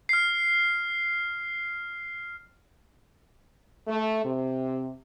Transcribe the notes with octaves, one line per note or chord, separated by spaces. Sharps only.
F6 C7
A3
C3